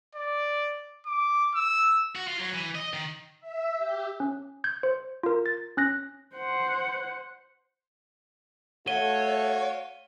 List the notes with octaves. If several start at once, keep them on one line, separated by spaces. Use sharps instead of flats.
D5
D6
E6
F#4
F4
F#3
E3
D#5
D#3
E5
G4
C#4
G6 G#6
C5
F4 A#4
A6
C#4 F#6 A#6
C5 F#5
A3 F#4 C#5 F5 D#7 G7